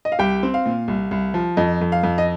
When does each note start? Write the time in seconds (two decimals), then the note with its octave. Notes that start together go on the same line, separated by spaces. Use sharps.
0.05 D#5
0.12 F5
0.19 C2 G4 G5
0.43 C4
0.54 F5
0.66 A#2
0.88 C2
1.11 C2
1.34 F3
1.57 F2 D#5
1.81 F2
1.92 F5
2.03 F2
2.18 D#5